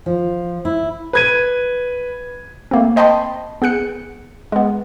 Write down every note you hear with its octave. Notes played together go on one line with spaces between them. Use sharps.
F3
E4
B4 G#6 D#7
A3 A#3 C4
C5 D#5 G5 A5 B5 C6
B3 G#4 F#6 C#7
G#3 B3